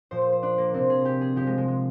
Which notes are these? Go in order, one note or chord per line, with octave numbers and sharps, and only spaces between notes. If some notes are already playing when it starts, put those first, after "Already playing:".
A#2 F3 C5
C5
C5
D4
A#3
C3 F3 C4
G#4
G4
G#4
C3 F3 G4
G#3
G#3
G#3